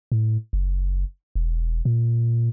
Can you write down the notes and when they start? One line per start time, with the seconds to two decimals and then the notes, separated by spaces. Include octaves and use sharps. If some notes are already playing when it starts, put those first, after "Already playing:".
0.12 A2
0.53 F#1
1.35 E1
1.85 A#2